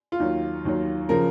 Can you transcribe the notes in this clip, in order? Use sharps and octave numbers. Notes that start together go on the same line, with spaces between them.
F4
D#2 D#3 F#3
D#2 D#3 F#3
C#3 F3 A#4